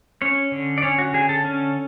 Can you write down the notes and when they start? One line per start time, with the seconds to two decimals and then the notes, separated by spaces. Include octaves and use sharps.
0.22 C#4 C#5
0.52 D3
0.78 D5
0.82 C#4 C#5
0.98 F#4
1.14 D3 G#4
1.29 A4
1.45 C#4